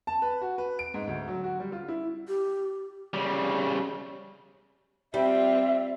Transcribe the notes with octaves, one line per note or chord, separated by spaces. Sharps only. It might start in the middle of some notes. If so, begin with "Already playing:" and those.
A5
B4
F#4
B4
D7
G#2
D2
F#3
F#4
G3
F4
E4
G4
C#3 G3
G3 C4 F4 E5